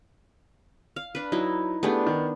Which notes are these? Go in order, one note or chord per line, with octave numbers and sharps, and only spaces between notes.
F5
D4 B4
F#3 D#4 E4
A3 B3 D4 G4 G#4
D#3